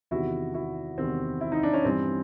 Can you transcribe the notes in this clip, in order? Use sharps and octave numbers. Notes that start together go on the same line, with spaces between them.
E2 C3 D#3 E4 F#4
E4 F#4
E2 C3 D#3 C4
E4
D#4
D4
C#4
G2 E3 C4